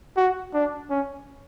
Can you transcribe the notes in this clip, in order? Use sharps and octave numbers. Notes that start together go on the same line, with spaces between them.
F#4
D4
C#4